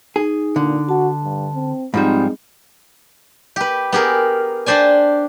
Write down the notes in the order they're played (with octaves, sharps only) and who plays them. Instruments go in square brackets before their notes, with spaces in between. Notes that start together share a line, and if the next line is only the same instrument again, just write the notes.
[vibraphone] D#4 [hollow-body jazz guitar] G#4
[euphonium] A#2 [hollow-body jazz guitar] D3
[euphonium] F#4 [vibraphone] A5
[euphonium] G2
C4
[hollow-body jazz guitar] G#2 F3 G3 [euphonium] G#3 [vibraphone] C4 D#4 B5
[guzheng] G4 B4
B3 G4 G#4 A#4
D4 G4 C5 D5 G#5